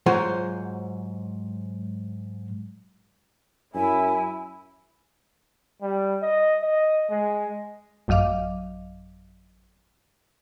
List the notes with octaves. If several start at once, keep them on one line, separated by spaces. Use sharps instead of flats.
G#2 F#3 F4 C5 C#5 F#5
F#2 E4 G#5
G3
D#5
D#5
G#3
A1 F#2 F#3 D#5 F5 D6